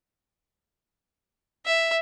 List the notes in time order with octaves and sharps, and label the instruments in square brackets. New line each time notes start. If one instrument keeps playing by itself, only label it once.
[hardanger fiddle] E5